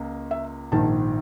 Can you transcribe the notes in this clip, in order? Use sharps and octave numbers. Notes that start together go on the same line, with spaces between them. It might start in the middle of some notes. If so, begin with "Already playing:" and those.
Already playing: C#2 A#3
E5
A#1 G#2 D#3 A5